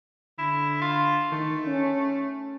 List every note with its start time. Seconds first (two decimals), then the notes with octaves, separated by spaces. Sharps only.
0.38 D3 E4
0.82 F4
1.32 D#3 A3
1.67 C#4